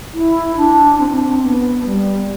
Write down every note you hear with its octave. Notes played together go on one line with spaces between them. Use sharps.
E4
D4
C4
D4
C4
B3
G3